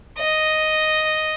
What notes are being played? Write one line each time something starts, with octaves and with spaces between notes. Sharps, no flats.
D#5